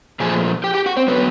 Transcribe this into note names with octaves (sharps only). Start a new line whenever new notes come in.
A#2 F3 A3 G#4 G#5
G4 G5
G4 G5
F#4 F#5
C4 C5
D3 F#3 B3 B4